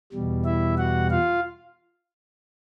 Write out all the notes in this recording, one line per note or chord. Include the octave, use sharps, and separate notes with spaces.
E2 B2 G3
E4 E5
F#4 F#5
F4 F5